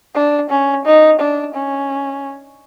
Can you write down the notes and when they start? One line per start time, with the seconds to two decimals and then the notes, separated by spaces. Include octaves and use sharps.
0.15 D4
0.50 C#4
0.85 D#4
1.20 D4
1.54 C#4